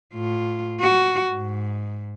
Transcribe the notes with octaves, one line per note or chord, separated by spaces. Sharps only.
A2 F4
F#4
G#2